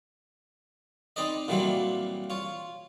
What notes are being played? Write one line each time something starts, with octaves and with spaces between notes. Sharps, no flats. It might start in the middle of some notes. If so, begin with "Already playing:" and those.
C4 D#4 B4 D5 D#5
A#2 E3 F#3 G3 A#3 C4
F4 C#5